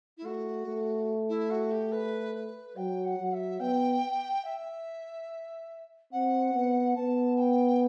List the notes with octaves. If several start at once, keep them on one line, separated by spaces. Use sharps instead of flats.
E4
A3 F#4
A3
E4
F#4
G4
B4
B4
F#3 G5
F#5
F#3
E5
B3 G5
E5
C4 F#5
B3
B3 A5
G5